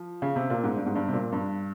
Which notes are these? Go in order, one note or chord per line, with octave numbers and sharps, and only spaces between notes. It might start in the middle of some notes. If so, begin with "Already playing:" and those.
Already playing: F3
C#3
C3
A#2
G#2
G2
G#2
G2
C3
A#2
G2